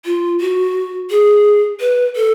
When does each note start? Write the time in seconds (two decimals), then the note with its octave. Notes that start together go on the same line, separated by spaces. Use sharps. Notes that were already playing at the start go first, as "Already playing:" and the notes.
0.05 F4
0.41 F#4
1.11 G#4
1.80 B4
2.16 A4